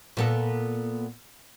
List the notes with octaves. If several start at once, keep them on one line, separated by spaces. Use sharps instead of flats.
A#2 B3 A4